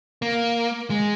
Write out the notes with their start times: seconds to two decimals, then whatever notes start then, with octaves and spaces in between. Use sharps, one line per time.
0.22 A#3
0.90 G#3